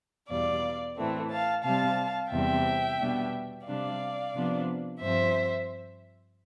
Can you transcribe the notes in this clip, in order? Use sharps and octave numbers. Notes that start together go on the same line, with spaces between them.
E2 B2 G3 D5 F5
A2 E3 A3 C4
F5 A5
C3 G3 C4 F5 A5
E2 C3 G3 C4 E5 G5
B2 G3 B3 D4
C3 G3 D4 D5 F5
C3 F3 B3 D4
G2 F3 C4 C5 E5